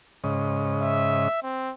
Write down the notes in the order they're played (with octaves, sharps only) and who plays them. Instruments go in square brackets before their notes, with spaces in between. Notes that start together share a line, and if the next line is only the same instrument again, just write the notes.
[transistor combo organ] G#2 C#3 D#5
[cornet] E5
C4